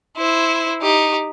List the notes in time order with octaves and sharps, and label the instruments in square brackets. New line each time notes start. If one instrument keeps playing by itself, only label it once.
[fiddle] E4 C5
D#4 G4